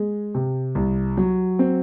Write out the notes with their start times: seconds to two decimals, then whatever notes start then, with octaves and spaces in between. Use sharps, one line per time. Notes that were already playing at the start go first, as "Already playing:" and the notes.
Already playing: G#3
0.35 C3
0.75 C2
1.17 F#3
1.59 C4